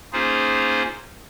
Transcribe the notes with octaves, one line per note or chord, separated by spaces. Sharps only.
A#3 C#4 D#4 F4 G#4 C5